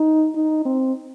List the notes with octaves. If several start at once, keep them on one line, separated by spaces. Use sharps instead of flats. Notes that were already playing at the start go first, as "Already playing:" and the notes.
Already playing: D#4
D#4
C4